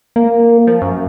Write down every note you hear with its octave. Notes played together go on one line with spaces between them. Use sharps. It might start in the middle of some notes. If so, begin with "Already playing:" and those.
A#3
F3
F#2